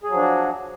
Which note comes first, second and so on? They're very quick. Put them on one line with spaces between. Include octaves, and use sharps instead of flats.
G#4 F#3 F3 D4 F#4